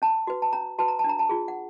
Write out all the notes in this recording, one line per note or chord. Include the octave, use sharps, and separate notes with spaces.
C#4 A5
F#4 B4
A5
C#4 A#5
F#4 B4 A5
A#5
A5
D4 A#5
A5
F4 G#4
F#5